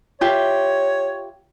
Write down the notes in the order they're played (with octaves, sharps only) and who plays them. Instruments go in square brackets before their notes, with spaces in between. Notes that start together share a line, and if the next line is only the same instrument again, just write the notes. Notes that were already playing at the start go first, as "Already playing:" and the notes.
[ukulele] F4 G4 E5 [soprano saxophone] C#5